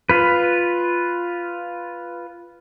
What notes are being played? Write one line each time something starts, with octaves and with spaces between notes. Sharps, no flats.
F4 B4